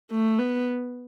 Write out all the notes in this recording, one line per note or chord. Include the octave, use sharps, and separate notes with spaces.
A3
B3